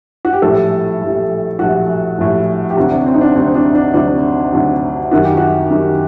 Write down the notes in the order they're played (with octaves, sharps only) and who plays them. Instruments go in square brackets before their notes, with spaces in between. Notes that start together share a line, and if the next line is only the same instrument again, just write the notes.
[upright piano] F#4
G4
A#1 A2 G3 A4
A#1 A2 G3
A#1 A2 G3 F#4
A#1 A2 G3
G4
D2 C3 F#3 F#4
D4
C4
D#4
D4
D2 C3 F#3 C4
D4
D4
D2 C3 F#3 D4
D2 C3 F#3
F#2 D#3 G3 F#4
G4
F#4
F#2 D#3 G3